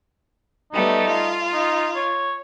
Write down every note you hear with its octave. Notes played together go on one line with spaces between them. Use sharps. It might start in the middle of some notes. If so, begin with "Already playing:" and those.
G3 A3 B3 D#4
F4
D#4
C#5